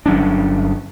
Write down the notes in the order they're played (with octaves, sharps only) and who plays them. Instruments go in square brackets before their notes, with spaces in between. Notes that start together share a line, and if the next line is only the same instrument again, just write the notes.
[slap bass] G1 F#3 C#4 D4